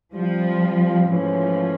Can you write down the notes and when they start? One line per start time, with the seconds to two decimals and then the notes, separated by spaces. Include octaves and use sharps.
0.14 F3 G3 C4 F4
1.07 G#2 E3 F3 A3 C#4